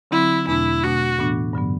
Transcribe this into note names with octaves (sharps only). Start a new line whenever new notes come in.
D3 F#3 C4 E4
E2 B2 A3 D4 E4
B2 A3 D4 F#4
A2 E3 B3 D4
G2 D3 F#3 B3